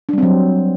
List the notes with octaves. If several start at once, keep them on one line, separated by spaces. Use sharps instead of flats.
F#3 G3 C4 D4